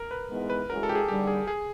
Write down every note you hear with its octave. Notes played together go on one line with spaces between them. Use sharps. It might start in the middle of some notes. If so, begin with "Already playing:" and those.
Already playing: A#4
B4
G#2 E3 G#3 B3
B4
E3 G#3 C#4 F#4 A#4
A4
G4
G#4
D#2 D3 G3 G4
G#4
G#4